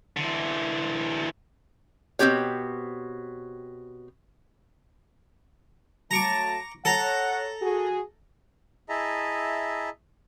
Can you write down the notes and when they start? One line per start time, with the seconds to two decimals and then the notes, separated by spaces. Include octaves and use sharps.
0.17 D3 E3
2.19 B2 C4 F#4 G4 C#5
6.11 F#3 A3 A5 A#5 C#6 D6
6.85 A4 C#5 F#5 A#5
7.62 F#4 G#4
8.89 E4 G#4 D#5 E5 A5 A#5